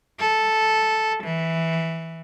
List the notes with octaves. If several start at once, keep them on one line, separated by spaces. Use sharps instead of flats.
A4
E3